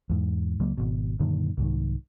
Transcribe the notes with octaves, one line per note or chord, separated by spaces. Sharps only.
E2 G#2
C#2 F#3 A#3
G#1 B2
F#2 A#2 D3 D#3
C2 G#2 D#3